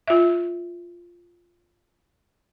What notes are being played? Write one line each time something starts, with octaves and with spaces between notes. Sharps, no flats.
F4 E5